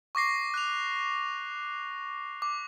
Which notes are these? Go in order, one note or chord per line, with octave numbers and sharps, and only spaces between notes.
C#6 D6 A#6 C7
F#6 F7
D6